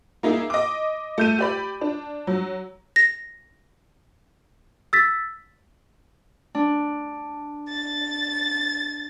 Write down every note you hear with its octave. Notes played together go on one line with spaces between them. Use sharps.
A#3 D#4 E4 G#4
D#5 D6
A3 G6 D#7
G4 D5 B5
D4
F#3
A#6
E6 A6 B6
D4
A6